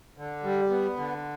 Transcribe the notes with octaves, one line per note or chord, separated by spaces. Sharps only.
D3
G3
B3
D3